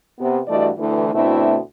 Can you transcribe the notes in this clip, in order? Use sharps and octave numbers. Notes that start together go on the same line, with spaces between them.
C3 B3
G2 E3 A3 F#4 D5 D#5
D2 E3
D2 B2 A3 C4 D4 E4